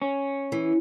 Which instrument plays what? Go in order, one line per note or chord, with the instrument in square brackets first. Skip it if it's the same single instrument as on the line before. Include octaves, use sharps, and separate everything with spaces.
[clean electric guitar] C#4
[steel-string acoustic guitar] E3